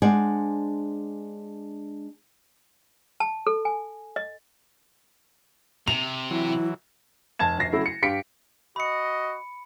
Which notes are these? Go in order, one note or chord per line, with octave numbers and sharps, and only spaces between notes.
G#3 D4 C5 D5 F#5 G#5
A5
A4
G#5
D#5
C3 F7
E3 F#3 E4
F1 A5 G#6 E7
F1 A#1 A6 A#6 C7
C#3 F#3 A3 E4
C#7
G2 G4 F5 B6 C#7 D7
F#4 D#5 B5 C#7